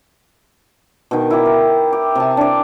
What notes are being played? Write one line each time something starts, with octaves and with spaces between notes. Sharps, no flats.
B2 D#3
E4 G4
A#4
G4
C3 G#5 A5
D4 D5